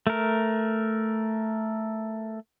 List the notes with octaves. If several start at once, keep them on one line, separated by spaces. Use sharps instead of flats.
A3 A#4